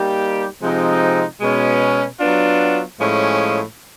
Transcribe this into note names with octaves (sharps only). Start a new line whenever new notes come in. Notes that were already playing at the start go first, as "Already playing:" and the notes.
Already playing: G3 A#3 D#4 G4
C3 F3 G#3 C4 D#4
B2 G#3 C#4
F#3 B3 D4 F4
A2 F3 G#3 C#4